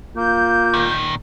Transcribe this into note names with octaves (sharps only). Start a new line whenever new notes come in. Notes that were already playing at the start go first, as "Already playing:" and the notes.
A#3 F4 G6
A#2 D#3